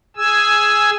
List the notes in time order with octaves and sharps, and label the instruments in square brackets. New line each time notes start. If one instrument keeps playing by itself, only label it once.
[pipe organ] G#4 G#5 E6